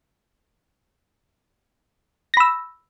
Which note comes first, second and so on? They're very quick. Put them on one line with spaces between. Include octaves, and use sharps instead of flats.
A#6 B5 E6